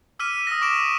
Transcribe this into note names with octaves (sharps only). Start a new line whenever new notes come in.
D6 E6 F6 B6 D#7
D#6 A#6
C#6 D6 D7 E7